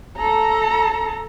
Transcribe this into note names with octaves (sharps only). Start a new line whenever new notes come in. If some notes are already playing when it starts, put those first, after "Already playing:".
A4 A#5